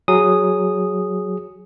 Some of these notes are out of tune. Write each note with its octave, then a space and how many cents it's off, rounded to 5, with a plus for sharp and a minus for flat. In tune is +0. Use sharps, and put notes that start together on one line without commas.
F#3 +0 G#4 +0 D#6 -5